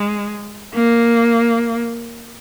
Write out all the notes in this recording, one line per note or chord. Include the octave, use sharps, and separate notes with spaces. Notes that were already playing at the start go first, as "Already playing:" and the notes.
Already playing: G#3
A#3